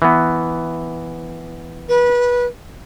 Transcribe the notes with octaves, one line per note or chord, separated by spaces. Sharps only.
E3 B3
B4